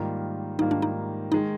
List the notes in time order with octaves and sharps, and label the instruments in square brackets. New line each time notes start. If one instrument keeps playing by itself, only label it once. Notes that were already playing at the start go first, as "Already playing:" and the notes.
Already playing: [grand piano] G#2 D#3 G3 A#3 F4
[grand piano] G#2 D#3 G3 A#3 F4 [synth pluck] D#4
[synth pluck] D4
D#4
[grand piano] D#3 G#3 [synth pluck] D#4